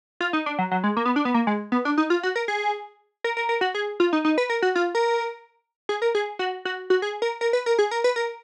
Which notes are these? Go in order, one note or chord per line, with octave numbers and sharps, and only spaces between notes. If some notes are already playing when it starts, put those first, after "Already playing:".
F4
D#4
D4
F#3
F#3
G#3
A#3
B3
D4
B3
A#3
G#3
B3
D4
D#4
F4
F#4
A#4
G#4
A#4
A#4
A#4
F#4
G#4
F4
D#4
D#4
B4
A#4
F#4
F4
A#4
G#4
A#4
G#4
F#4
F#4
F#4
G#4
A#4
A#4
B4
A#4
G#4
A#4
B4
A#4